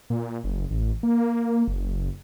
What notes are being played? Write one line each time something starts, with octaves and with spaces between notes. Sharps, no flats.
A#2
F#1
A1
A#3
F#1